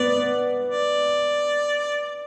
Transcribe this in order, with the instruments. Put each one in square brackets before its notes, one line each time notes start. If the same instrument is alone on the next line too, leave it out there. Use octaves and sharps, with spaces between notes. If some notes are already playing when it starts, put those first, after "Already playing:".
Already playing: [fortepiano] B3 [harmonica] D5
[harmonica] D5